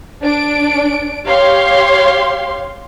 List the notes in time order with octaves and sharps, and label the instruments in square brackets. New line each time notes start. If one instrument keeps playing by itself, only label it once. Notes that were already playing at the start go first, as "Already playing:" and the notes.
[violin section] D4 D7
G4 C#5 F5 C6